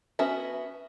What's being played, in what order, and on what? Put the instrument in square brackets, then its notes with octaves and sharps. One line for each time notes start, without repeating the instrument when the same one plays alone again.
[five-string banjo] B3 C#4 F#4 E5